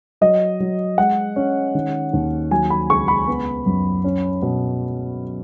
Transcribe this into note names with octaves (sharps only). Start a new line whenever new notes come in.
F#3 D#5
F#3
G#3 F#5
C#4
D#3
D#2
F#3 G#5
B5
C#2 C#6
B5
B3
F#2
C#4
B2